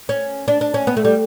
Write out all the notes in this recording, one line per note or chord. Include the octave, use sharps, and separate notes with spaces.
C#4
D4
D4
C#4
B3
A3
G3